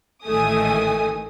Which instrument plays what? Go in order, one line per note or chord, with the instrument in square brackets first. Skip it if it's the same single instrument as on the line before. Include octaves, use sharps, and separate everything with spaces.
[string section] A1 A2 D#3 A3 G#5 D#6